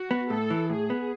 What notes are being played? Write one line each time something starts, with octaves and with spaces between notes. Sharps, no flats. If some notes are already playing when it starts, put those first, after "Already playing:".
Already playing: F#4
B3
A2 A4
E3
A2 G#4
B3